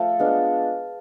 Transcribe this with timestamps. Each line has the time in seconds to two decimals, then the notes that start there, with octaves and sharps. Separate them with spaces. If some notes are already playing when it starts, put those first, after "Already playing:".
Already playing: F3 A3 A4
0.19 G#3 B3 D4 F4